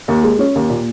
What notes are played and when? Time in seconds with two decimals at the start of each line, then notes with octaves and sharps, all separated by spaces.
0.08 D#2
0.23 G#3
0.39 C#4
0.55 D#2
0.70 A#2